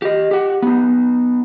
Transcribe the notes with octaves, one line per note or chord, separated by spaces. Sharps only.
G4 D#5
G4 F#5
B3 D#4